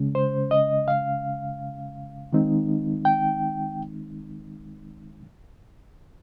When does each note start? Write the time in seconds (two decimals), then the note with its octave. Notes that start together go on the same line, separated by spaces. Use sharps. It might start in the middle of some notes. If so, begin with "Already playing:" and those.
Already playing: C#3 G#3 C#4
0.15 C5
0.51 D#5
0.88 F5
2.33 D#3 G#3 C4 D#4
3.05 G5